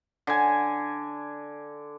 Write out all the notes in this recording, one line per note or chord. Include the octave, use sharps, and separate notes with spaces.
D3 G#5